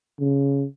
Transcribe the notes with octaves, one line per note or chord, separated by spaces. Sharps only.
C#3